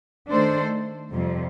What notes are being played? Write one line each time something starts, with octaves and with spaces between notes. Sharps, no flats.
D#3 A3 D4 A4 C5
F2 C3 G3